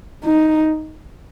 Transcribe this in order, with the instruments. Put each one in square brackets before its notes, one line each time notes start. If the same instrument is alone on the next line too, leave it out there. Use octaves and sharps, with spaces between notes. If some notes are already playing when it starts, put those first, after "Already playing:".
[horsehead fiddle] D#4